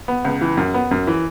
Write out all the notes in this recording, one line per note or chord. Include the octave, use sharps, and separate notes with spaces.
B3
C#2
E3
F#2
B3
F#2
E3